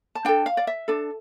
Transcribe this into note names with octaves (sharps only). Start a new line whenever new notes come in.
A5
D4 A4 G5
F5
D5
E5
D4 A4